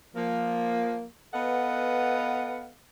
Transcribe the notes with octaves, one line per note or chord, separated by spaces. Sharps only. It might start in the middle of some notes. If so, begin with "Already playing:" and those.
F3 A#3
B3 A4 B4 D#5 F5 F#5